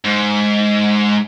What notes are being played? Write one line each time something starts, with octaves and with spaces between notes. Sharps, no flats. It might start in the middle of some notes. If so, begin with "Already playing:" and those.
G#2